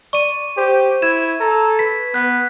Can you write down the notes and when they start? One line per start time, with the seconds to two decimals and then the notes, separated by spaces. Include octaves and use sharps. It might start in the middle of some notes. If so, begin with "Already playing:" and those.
0.13 D5 C#6 D#7
0.57 G4 C5
1.02 E4 G#6 E7
1.40 A4 A#5
1.79 B4 B6
2.14 B3 F#6 B6